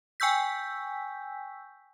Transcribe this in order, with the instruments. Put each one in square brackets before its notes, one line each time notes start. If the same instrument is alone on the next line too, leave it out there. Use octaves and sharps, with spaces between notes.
[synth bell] G5 G#5 C#6 E6 G6 B6